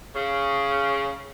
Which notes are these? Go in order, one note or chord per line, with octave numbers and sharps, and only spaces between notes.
C#3